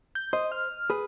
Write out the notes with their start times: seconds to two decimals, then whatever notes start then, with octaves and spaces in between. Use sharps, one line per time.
0.15 G6
0.33 C5 D#5
0.52 F6
0.90 G#4 B4